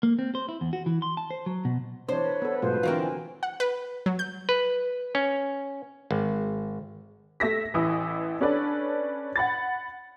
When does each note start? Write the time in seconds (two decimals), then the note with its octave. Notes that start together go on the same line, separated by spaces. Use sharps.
0.03 A#3
0.19 C4
0.35 C5
0.49 E4
0.61 E2
0.73 F#4
0.86 E3
1.02 C6
1.17 A5
1.31 C5
1.46 F#3
1.65 B2
2.09 E3 C4 D4 C5 C#5
2.25 B4
2.42 B3 A4
2.62 G#2 B2 F#3 A3 F4 B4 C5
2.83 D3 E3 C4 D4 F4 F#4 A#4
3.01 G#5
3.43 F#5
3.60 B4
4.06 F#3
4.19 G6
4.49 B4
5.15 C#4
6.11 G#1
7.40 A3 E5 A#6 B6
7.74 A1 E3 E4 D#6
8.41 C#4 D4 A4 B4 D5
9.36 F#5 B5 A6